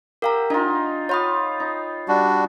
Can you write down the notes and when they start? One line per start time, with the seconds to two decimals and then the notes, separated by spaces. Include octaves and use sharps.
0.22 G4 A#4 F5 A#5
0.50 D4 D#4 F4
1.09 F4 C#5 B5 D#6
1.60 D#4
2.08 G3 D4 F#4